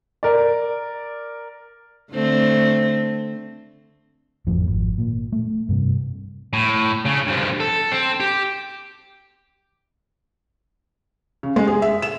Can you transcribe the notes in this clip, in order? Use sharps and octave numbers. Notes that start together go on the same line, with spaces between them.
A#4 D5
D3 A3 C4
G#1 F2 A2 F3
G#1
A#2
A3
G2 C3
A2
C#3
G2 F3
A4
C4
G4
C#3
G#3
G#4
E5
E7